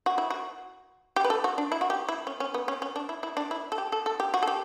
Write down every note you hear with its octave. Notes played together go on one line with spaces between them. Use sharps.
F#4
E4
F#4
G4
B4
A4
F#4
D4
E4
F#4
G4
E4
C#4
C#4
B3
C#4
C#4
D4
E4
E4
D4
E4
A4
G4
A4
A4
G4
F#4
A4
G4